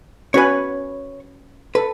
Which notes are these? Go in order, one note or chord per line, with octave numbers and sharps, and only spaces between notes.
C#4 F#4 B4 C#5 G#5
A4 B4